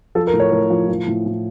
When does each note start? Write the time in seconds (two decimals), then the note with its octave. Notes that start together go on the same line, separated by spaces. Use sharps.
0.15 F3 A4
0.27 A#4
0.33 A2
0.40 C#5
0.52 A2 A#4
0.70 F3
0.89 F3
1.08 A2
1.26 A2